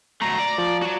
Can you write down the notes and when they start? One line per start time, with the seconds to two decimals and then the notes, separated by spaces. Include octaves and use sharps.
0.22 F#3 A3 A#5
0.39 D5
0.58 F3
0.82 F#4 A#5